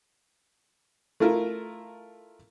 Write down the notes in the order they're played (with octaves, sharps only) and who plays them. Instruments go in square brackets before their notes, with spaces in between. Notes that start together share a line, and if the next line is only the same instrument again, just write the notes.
[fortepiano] A3 E4 F4 A#4